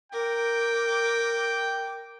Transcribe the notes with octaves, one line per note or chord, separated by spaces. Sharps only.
A#4 G5 D6